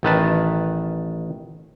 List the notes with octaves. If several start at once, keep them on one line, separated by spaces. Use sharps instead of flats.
A1 D#3 B4 A5